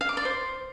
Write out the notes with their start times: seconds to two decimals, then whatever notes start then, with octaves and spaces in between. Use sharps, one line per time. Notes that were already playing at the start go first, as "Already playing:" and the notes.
0.01 F5
0.09 D6
0.17 D5
0.25 C5